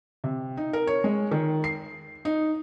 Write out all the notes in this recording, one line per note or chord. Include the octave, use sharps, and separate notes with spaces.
C3
D#4
A#4
C#5
G#3
D#3
C7
D#4